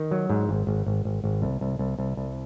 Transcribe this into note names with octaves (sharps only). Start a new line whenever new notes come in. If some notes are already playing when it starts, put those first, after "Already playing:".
Already playing: D#3
F#3
G#2
G#1
G#1
G#1
G#1
G#1
C2
C2
C2
C2
C2